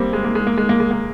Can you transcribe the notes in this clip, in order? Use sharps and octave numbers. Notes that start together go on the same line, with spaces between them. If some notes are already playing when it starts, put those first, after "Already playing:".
Already playing: G3 A#3 C4
G#3
A#3
G#3
A#3
G#3
A#3
G#3
A#3